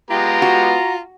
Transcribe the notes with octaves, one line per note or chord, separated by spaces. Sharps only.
G#3 B3 F4 G4 A#5
F#4